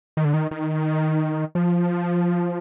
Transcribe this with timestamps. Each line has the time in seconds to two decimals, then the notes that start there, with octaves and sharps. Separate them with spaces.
0.17 D#3
0.25 D3
0.34 D#3
0.51 D#3
1.55 F3